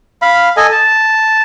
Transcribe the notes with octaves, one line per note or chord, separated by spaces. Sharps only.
F5 B5
A4 D#5 G#5
A5